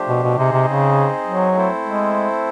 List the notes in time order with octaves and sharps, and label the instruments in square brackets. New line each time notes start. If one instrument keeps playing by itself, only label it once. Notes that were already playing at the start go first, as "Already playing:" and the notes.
Already playing: [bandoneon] F3 A3 D4 G4 C5
[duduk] B2
B2
[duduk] C3 [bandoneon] C4 D#4 G#4 C5 D#5
[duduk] C3
C#3
F#3
[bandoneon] A3 C4 E4 A4 C5
[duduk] G#3